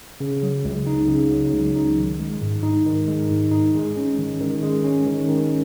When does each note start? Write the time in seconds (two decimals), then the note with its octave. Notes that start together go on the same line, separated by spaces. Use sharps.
0.20 C#3
0.43 F#3
0.65 C#2
0.87 D#4
1.08 C#3
1.30 F#3
1.53 C#2
1.75 D#4
1.97 D#3
2.20 G#3
2.42 G#2
2.63 D#4
2.86 D#3
3.08 G#3
3.30 G#2
3.51 D#4
3.75 G#3
3.97 C#4
4.19 D#3
4.41 D#3
4.63 G#3
4.84 C#4
5.06 D#3
5.29 D#3